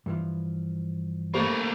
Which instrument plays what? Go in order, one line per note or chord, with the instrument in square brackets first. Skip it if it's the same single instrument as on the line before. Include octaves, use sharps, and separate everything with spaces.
[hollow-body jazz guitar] G2 E3 F3
[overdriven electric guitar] A3 A#3 [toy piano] G4 C5 B5